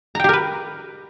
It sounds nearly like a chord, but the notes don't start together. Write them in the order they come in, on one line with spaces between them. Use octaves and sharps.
A#5 G5 G4 A#4 B4